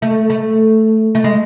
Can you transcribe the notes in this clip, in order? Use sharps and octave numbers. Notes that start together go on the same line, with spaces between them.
A3
A3
A3
G#3